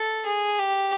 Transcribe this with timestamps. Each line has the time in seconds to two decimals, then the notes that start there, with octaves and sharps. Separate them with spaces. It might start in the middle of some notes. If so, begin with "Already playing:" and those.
Already playing: A4
0.26 G#4
0.59 G4